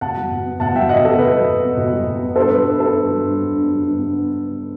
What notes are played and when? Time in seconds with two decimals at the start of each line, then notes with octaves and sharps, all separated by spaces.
0.01 B2 F#5 A5
0.17 F#3
0.31 B2
0.45 B3
0.60 B2 F#5 A5
0.75 F#3 E5 G5
0.89 B2 D#5 F#5
1.04 B3 A4
1.19 B2 B4
1.33 F#3
1.48 B2
1.62 B3
1.77 B2
1.93 F#3
2.06 B2
2.22 B3
2.36 G2 A4 C5
2.51 F#3 B4
2.65 G2 B4
2.80 B3 A4
2.95 G2
3.10 F#3
3.24 G2
3.38 B3
3.53 G2
3.67 F#3
3.82 G2
3.98 B3